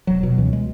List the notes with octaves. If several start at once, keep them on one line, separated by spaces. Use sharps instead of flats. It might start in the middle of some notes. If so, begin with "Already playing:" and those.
E1 F#3
B2
C#2 E3
G#3